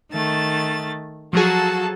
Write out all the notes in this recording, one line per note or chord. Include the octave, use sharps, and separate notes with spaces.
D#3 A3 A6
F3 F#3 F#4 G#4 A4 A5